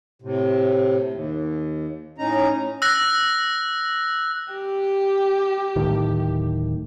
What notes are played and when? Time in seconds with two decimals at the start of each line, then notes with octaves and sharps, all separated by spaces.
0.22 A2 C3
1.11 D#2
2.18 A2 C#4 D#4 A#5
2.82 E6 F#6 A#6
4.53 G4
5.76 D1 A2 D#3